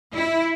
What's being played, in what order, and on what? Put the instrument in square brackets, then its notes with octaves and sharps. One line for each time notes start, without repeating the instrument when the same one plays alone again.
[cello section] E4